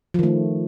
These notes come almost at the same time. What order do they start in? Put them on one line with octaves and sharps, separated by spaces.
F3 D#3 A3